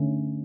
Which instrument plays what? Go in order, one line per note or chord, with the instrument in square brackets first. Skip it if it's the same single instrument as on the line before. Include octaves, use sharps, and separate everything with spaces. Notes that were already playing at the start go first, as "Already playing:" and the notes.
Already playing: [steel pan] D3 A3 C#4